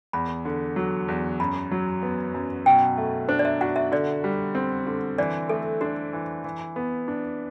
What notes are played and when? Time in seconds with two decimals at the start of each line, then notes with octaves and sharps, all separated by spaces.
0.13 E2 B5
0.45 D3
0.76 F#3
1.08 E2
1.40 F#2 B5
1.71 F#3
2.03 B3
2.34 F#2
2.66 B2 G5
2.97 A3
3.28 D4 C5
3.39 D5
3.45 E5
3.61 F#4 F#5
3.76 E5
3.92 D3 D5
4.24 G3
4.55 C4
4.87 D3
5.18 E3 D5
5.49 A3 A4
5.81 D4 F#4
6.13 E3
6.44 E3
6.76 B3
7.08 D4